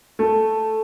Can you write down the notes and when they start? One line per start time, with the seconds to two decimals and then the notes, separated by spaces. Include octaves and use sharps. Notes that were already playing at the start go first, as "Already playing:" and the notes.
0.19 A3